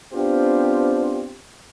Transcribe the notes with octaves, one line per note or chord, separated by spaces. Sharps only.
B3 C4 D4 F4 G4 C5